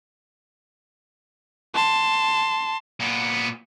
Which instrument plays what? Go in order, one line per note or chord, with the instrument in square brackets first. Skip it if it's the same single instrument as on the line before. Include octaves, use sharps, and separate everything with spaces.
[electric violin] A5 C6
[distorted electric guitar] A#2 B3